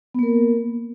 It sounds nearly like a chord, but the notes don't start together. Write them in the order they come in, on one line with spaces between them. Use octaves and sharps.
B3 A#3 A#4